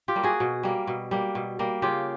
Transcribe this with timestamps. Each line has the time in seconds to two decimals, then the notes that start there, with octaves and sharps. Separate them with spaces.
0.08 F4 G4
0.15 G3 A#3
0.23 F#4 G#4
0.40 B2
0.63 G3 A#3
0.87 B2
1.11 G3 A#3
1.35 B2
1.59 G3 A#3
1.82 C#3 F4 G4